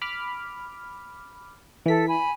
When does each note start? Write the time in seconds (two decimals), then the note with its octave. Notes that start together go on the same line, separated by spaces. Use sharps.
0.02 B5 D6 F6
1.86 E3 A4 B6
2.08 G#5 B5